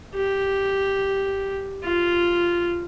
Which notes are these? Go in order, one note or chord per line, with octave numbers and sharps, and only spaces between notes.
G4
F4